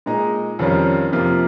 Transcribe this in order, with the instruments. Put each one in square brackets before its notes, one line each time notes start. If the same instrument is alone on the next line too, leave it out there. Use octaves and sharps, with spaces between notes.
[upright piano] A#2 G#3 D#4
F2 D#3 G3 C#4 F4
F2 C3 F3 A#3 F4